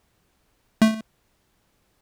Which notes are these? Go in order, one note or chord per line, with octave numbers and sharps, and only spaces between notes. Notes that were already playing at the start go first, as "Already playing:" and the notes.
A3